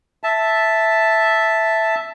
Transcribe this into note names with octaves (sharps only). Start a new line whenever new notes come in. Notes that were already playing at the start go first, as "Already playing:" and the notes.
E5 A5